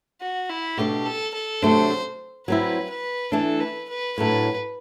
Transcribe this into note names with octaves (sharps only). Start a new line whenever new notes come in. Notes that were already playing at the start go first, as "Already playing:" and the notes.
F#4
E4
B2 A3 D4 G4
A4
A4
C3 F#3 A3 D4 C5
F#3 C4 E4 B4
B4
E3 A3 D4 A4
B4
B4
A2 F#3 A3 D4 B4